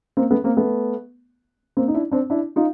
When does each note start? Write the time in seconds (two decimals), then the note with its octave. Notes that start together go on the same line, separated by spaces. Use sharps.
0.17 A#3 C4
0.30 A3 B3
0.44 A#3 C4
0.57 A3 B3
1.77 A#3 C4
1.88 D#4
1.94 D4 E4
2.12 C4 D4
2.30 D4 E4
2.56 D#4 F4